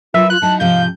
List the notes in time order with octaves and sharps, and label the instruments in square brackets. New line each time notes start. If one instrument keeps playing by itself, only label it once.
[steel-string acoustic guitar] F#3 A#4 B4 [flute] F4 [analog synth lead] E5
[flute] F4 [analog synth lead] F#6
[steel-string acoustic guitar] F#3 D#4 E4 [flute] A5
[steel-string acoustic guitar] G#2 C3 F3 [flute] F5 [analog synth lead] G6